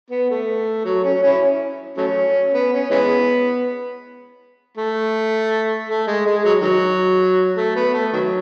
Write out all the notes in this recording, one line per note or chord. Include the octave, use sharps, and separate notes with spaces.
B3
A3
F#3
C#4
C#4 E4
F#3 A3 C#4
B3
C#4
E3 G#3 B3
A3
A3
G#3
G#3
F#3
D#3 F#3
A3
B3
A3
D#3 F#3